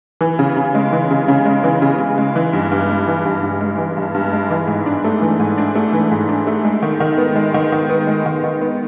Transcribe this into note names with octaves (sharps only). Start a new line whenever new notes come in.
E3
C#3
C#3
G#3
E3
C#3
C#3
G#3
E3
C#3
C#3
G#3
E3
G2
G2
G#3
E3
G2
G2
G#3
E3
G2
G2
G#3
E3
G#2
D4
A3
E3
G#2
D4
A3
E3
G#2
D4
A3
G#3
D#3
D#3
B3
G#3
D#3
D#3
B3
G#3
D#3
D#3
B3